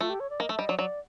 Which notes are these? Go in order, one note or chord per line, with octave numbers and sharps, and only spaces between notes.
A3 F4
G4
C#5
D5
A#3 D#5
A3 E5
G3 D#5
F#3 D5
F#3 D5